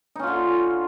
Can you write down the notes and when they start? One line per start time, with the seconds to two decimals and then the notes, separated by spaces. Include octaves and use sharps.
0.15 D#4
0.19 C#4
0.23 F4
0.27 D3